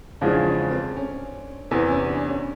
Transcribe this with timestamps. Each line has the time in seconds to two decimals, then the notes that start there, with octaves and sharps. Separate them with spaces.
0.21 E2 C#3 F3 G#3 D4
0.46 C#4
0.71 C4
0.97 C#4
1.71 E2 C3 E3 B3
1.90 C#4
2.09 D4
2.28 C#4